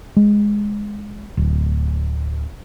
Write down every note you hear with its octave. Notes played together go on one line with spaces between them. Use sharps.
G#3
D1